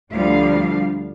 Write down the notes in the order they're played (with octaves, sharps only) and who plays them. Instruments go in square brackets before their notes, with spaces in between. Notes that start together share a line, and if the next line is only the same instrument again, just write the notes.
[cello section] D2 D3 F3 G3 D4 F5